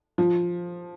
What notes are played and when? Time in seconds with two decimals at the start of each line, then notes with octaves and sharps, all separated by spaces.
0.18 F3